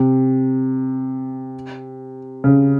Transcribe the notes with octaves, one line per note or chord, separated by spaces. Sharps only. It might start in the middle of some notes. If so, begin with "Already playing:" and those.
Already playing: C3
C#3